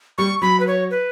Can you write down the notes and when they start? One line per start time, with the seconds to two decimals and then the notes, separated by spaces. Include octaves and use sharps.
0.18 G3 C#6
0.42 F#3 B5
0.60 B4
0.67 C#5
0.91 B4